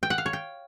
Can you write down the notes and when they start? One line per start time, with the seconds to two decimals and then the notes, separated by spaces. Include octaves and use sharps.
0.03 G5
0.10 F#5
0.18 F5
0.26 C#5
0.33 G5